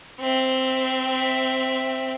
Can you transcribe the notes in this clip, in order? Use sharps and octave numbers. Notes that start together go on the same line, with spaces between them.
C4 E5